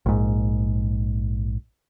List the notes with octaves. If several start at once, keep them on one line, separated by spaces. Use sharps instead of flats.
A#1 G#2